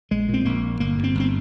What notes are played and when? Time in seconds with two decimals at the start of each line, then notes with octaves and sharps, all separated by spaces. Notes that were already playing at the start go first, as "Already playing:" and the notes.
0.11 A#1 G#3
0.29 A#2 C4
0.45 A#1 A#3
0.63 A#2
0.80 G1 A#3
0.98 G2
1.04 C4
1.15 G1 C4